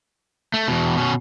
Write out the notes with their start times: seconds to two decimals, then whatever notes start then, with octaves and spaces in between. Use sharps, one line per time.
0.54 A3
0.68 E2 B2
0.97 B2 C#4